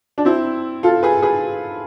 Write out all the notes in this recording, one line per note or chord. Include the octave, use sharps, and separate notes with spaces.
D4
C4 E4
F4 A4
G#4 B4
G#4 B4